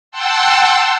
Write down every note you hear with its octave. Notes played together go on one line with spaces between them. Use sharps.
F#5 G5 A5 C6 E6